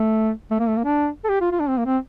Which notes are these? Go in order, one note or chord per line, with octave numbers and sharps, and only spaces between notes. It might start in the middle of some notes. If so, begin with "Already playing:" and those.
Already playing: A3
A3
A#3
A3
A#3
D4
A4
G4
F4
F4
D4
C4
A#3
C4